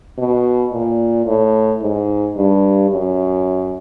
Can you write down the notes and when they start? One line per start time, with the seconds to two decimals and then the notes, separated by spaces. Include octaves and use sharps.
0.18 B2
0.73 A#2
1.26 A2
1.82 G#2
2.36 G2
2.90 F#2